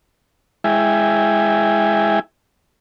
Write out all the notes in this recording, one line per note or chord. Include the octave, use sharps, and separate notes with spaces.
G#3 E4 E5 G5 G#5